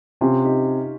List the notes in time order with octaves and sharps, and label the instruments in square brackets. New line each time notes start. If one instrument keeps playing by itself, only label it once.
[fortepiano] C3 [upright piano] C#4 F4
[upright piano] D#4 G4